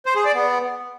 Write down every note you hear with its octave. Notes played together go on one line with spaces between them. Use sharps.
C5
G#4
D5
B3